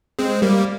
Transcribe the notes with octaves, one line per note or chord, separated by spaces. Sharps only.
G#3 C4
G3 A#3